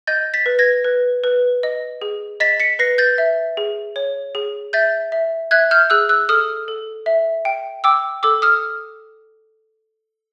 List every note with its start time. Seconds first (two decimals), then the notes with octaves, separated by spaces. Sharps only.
0.07 D#5 G6 A6
0.34 A6 B6
0.46 B4
0.59 G#6 A#6
0.84 B4
1.24 B4
1.63 D#5
2.01 G#4
2.40 D#5 A6 B6
2.60 B6 C#7
2.79 B4 A#6 C7
2.98 G6 A6
3.18 E5
3.57 G#4
3.96 C#5
4.35 G#4
4.73 E5 G6 A6
5.12 E5
5.51 E5 F#6 G#6
5.71 F6 G6
5.90 G#4 E6 F#6
6.09 E6 F#6
6.29 A4 D#6 F6
6.68 A4
7.06 E5
7.45 G5
7.84 G5 D6 E6
8.23 A4 D6 E6
8.42 D#6 F6